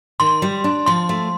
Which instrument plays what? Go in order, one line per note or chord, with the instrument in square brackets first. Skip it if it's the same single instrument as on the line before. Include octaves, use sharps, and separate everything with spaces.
[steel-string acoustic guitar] D#3 [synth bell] C6
[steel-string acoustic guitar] G3
D4
[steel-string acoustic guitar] F3 [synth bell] C6
[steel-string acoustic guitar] A3